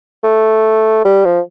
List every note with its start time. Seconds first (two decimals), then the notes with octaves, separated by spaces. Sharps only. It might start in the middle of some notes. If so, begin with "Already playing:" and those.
0.24 A3
1.05 G3
1.25 F3